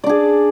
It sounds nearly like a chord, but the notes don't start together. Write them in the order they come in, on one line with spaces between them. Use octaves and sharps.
D5 D4 G#4